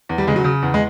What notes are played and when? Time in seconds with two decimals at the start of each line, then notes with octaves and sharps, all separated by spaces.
0.09 E2
0.18 G3
0.27 C#3 G#3
0.36 F#3
0.44 C#3
0.63 E2
0.74 G#3